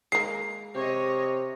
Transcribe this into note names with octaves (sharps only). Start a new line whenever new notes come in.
G#3 A#3 C7
C3 C#5 D#5